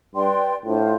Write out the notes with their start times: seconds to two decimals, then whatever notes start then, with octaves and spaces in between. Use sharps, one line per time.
0.15 G2 B4 D5 G5 C6
0.65 A2 D4 F4 C5